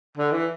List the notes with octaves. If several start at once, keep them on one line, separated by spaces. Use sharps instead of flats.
D3
E3